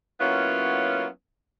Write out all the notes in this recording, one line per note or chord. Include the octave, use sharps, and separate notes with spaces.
F#3 A#3 B3 C#4 E4 F4